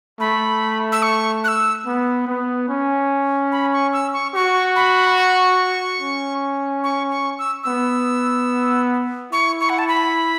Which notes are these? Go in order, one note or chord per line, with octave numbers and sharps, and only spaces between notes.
A3 B5
E6
C#6
F#6
E6
B3
B3
C#4
B5
C#6
E6
C#6
F#4 C#6
B5
C#6
C#4
C#6
C#6
E6
B3 E6
E4 C#6
C#6
F#5
A5
B5